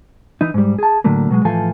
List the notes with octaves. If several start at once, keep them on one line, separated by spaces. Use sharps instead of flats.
E3 D#4
G#2 G3
G#4 A5
A2 D3 F#3 A3 A#3
B2 F#3 G#3
A2 E3 F3 A4 F5 G#5